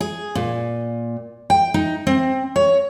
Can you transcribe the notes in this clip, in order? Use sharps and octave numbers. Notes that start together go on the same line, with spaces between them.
G#4
A#2
G5
D#4
C4
C#5